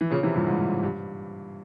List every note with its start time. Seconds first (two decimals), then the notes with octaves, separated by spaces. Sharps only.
0.01 E3
0.10 A#2 C#3
0.23 C3 E3
0.34 G2 A#2
0.46 G#2
0.83 G2